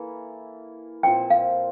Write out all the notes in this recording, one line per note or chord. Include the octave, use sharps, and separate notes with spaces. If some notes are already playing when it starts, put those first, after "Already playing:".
Already playing: E3 A#3 E4 A4
A#2 F3 C4 G5
F5